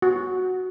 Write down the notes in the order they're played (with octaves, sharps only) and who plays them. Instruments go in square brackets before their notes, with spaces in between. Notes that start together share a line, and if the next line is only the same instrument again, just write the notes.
[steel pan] F#4